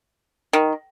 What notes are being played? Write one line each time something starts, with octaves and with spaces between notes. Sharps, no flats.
D#3